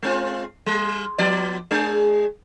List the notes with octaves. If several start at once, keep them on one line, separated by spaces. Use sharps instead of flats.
G#3 C4 F4
G3
F3 B3 D5
G#3 D4 G#4